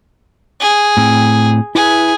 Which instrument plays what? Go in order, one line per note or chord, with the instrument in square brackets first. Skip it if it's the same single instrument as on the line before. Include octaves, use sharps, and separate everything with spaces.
[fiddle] G#4
[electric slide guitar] A2 C4 G5
[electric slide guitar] E4 B4 E5 [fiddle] G#4